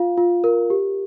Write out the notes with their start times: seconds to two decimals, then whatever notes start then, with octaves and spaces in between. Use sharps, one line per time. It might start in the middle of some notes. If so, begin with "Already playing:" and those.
Already playing: F4 F5
0.18 F4
0.44 A#4
0.70 G4